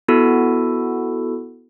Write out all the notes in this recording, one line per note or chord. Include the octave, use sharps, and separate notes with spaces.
B3 E4 F#4 A4